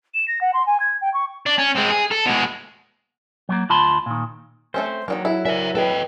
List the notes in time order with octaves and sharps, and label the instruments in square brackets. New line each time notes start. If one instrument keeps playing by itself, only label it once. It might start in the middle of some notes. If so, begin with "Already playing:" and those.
[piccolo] E7
A#6
F#5
C6
G#5
G#6
G5
C#6
[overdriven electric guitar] D4
C#4
G#3 C4
G#4
A4
B2 G#3
[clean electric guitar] F#3 A3 A#3
D2 F4 A5 B5 C6
A#2 D#3
[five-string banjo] A3 C4 C#4 [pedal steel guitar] C5
[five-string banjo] D#3 G3 A#3 [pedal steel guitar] F#3
[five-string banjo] E4 [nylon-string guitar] A4
[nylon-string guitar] A#4 D5 G#5 [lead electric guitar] C5 E5
[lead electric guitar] A4 D#5 [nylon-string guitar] B4 G5